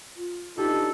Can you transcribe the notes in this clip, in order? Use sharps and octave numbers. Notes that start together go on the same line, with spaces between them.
F4
E3 D4 D#4 G4 A4